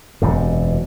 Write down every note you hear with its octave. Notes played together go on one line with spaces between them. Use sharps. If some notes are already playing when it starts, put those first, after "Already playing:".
E1 F#2 C3